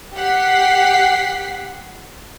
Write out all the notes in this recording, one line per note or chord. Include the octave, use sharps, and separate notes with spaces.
G4 F#5 B6 C7